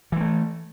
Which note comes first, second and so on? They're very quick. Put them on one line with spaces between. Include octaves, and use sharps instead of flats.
E3 G#3 A3